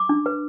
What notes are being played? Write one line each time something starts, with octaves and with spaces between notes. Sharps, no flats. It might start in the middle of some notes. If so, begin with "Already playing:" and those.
Already playing: D6
D4
B4